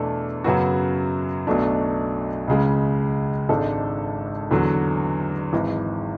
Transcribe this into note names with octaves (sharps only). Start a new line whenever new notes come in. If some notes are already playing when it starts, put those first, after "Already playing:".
Already playing: E2 B2 A3 D4 A4
F#2 C#3 F#3 B3 F#4
B1 B2 F#3 A3 D4
C#2 C#3 G#3
G#1 G#2 G#3 D4 A4
E2 D3 F#3
G#1 G#2 E3